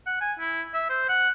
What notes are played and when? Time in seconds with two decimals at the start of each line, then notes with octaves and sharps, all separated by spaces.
0.07 F#5
0.21 G#5
0.39 E4
0.74 E5
0.90 C5
1.09 F#5